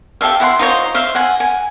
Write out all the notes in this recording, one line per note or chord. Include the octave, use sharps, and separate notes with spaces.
G4 A4 E5 F5
E4 F#5 G#5 C6
D#4 F4 C5 C#5
C5 E5 F5
F#5 G#5
G#5